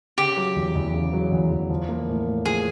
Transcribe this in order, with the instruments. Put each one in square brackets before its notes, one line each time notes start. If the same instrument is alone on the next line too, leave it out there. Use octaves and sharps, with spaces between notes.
[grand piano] C#3 [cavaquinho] G4
[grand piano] F#3
E2
E2
C#3
F#3
E2
E2
F3
A#3
A2
A2
[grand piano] F3 [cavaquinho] G#4